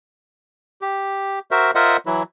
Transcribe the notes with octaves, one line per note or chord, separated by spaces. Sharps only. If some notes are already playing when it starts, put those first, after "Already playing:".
G4
F#4 A#4 C5 E5
F4 A#4 C5 D#5 E5 F#5
E3 F#3 E4